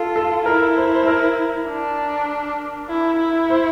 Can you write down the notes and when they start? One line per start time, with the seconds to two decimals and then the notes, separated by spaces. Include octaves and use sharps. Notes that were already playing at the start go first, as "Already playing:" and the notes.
Already playing: F4 A4
0.16 A4
0.45 E4 A#4
0.77 C5
0.94 C5
1.07 A#4
1.68 D4
2.89 E4
3.19 E4
3.50 C5